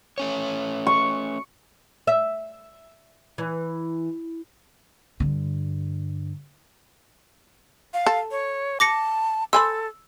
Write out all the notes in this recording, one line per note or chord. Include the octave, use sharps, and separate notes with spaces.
A3 C#4 C#5
C#6
E5
E3
G2 D3
F5
A4
C#5
A5 D6 A#6 C#7
A4 C5 G#5 B5 E6